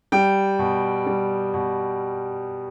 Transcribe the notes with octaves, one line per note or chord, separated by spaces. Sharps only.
G3 G5
B2
G3
B2